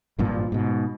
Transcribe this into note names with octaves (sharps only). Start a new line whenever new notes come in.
G#1 G2 A#2 F3
G#2 B2